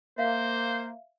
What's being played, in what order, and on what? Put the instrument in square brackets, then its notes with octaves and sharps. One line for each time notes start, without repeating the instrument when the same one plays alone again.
[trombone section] A#3 [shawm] C5 [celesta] E5 F5